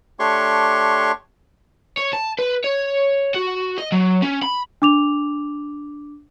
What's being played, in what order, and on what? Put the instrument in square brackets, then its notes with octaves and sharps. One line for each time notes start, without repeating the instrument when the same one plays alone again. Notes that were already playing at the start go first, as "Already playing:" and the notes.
[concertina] A3 D4 G4 C#5 C6 C#6
[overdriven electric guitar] C#5
A5
B4
C#5
F#4
D#5
F#3
C#4
B5
[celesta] D4 D6 F7